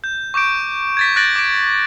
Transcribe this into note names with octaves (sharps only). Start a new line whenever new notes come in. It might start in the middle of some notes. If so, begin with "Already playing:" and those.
G6
C#6 D6 G6 D7
G#6 A6 B6
F#6 G6 A6 A#6 D7 F#7
D6 D7